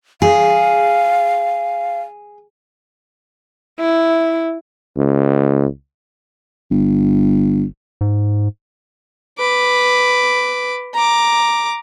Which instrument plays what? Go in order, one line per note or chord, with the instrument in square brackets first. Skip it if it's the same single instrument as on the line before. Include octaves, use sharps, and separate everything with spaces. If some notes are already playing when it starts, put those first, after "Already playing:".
[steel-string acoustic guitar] G#4 [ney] F5
[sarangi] E4
[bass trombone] C#2
[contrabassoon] G1
[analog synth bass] G#2
[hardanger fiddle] B4 D6
A#5 D6